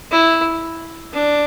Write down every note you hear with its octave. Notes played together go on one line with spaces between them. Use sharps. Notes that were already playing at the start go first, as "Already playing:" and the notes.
E4
D4